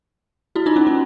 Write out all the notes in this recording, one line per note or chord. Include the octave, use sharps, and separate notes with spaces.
E4 F#4
D#4 F4
C#4 D#4
C#4